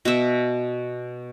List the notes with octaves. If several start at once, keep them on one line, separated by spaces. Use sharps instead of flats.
B2 E5